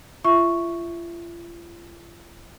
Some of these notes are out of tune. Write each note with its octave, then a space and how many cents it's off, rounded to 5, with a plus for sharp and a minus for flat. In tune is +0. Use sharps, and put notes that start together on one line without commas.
F4 -40 E5 +0 C#6 +0